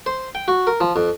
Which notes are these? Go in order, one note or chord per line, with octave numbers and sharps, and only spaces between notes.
C5
G5
F#4
A#4
F3
F2